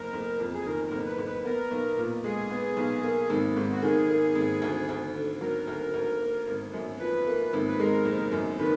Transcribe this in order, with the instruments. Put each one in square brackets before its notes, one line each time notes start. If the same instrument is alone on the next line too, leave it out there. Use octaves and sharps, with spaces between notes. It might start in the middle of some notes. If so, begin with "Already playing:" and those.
Already playing: [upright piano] F#1 [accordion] A#4
[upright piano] F#1
F2
[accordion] G#4
[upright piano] D#3 [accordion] A#4
[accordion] A#4
[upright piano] F#1
[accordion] B4
[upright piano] F#1
[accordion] B4
[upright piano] B3 [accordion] A#4
[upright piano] B1
A#2
[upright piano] G#3 [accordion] G#4
[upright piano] B3
B1
A#3
G#1
G#2
[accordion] F#4
[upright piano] D#3 [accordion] G#4
[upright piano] A#3
G#1
D2
D2
D3
[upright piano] F#3 [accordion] A#4
[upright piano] D2
D2
A#3
G#1
F#2
[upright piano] F3 [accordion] B4
[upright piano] A#3
G#1
[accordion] B4
[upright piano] G#3 [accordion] A#4
[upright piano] F#1
F#2
[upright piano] D#3 [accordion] B4